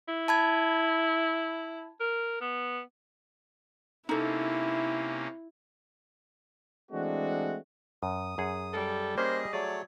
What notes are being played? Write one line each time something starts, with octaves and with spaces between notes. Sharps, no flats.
E4
A5 B5 G#6
A#4
B3
C3 A#3 C#4 D#4 E4 A4
E3 G#3 A3 C4 D4 F#4
F#2 D#6
F#2 G#4 F#5
G3 A4
A#3 C#4 G#4 C5 D#5
F#3 A3 G#4 C#5 D5